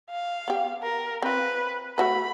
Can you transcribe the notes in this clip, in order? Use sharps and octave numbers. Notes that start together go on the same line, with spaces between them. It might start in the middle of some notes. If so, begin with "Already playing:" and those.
F5
B3 G4
A#4
C4 F4 B4
A3 F#4 B4 B5